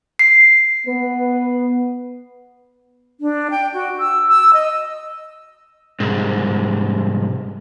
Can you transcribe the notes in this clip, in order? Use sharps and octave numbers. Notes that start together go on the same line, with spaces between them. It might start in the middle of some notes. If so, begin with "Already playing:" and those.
C7
B3 B4
D4
G5
F#4
E6
E6
D#5
C2 G#2